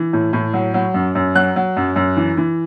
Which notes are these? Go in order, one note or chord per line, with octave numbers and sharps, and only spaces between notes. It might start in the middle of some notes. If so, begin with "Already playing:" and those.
Already playing: E3
A2
A2
F#3
F#3
F#2
F#2
F#3 F#6
F#3
F#2
F#2
E3
E3